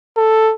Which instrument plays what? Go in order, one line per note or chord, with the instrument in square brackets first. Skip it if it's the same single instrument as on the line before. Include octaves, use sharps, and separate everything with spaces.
[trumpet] A4